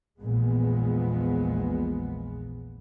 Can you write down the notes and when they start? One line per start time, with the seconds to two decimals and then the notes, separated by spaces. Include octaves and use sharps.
0.20 A#1 E2 A#2 G#3 B3